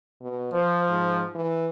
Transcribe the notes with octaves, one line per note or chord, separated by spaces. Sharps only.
B2
F3 C5
G#2
E3